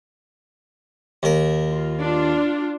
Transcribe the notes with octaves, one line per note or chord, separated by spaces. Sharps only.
D#2 A#4
F4
D4 F4